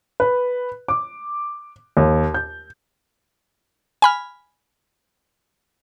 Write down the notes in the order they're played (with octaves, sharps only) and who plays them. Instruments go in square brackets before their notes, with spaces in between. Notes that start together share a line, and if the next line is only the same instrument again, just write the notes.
[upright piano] B4
D6
D#2
G6
[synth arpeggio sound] G#5 B5 F6